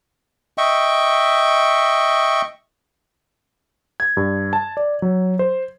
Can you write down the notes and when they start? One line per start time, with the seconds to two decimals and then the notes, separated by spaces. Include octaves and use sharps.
0.58 D#5 E5 G5 C#6
4.00 G#6
4.17 G2
4.53 A5
4.77 D5
5.02 F#3
5.39 C5